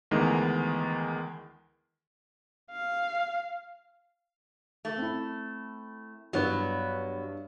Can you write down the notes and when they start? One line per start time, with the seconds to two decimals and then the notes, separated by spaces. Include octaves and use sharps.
0.11 D2 D#3 E3 G#3 B3
2.71 F5
4.85 A3
4.98 C4 E4
6.33 G2 F#3 B3 E4 C#5